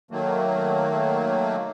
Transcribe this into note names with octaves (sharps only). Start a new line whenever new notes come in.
D#3 F#3 A3 A#3